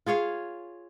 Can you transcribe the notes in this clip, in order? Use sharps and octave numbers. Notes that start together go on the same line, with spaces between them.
F4 G#4 C#5 F5